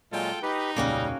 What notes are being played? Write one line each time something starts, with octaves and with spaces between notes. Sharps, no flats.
A#2 F#3 G#3 F4 A4 G5
D#4 G4 B4
E1 C#2 A#2 C#3 G3 A#3 C#4 F#4